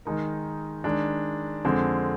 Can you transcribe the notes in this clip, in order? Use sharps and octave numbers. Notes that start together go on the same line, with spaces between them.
D#3 G#3 D#4 A#4
D#3 G#3 D4
F2 D3 G#3 C4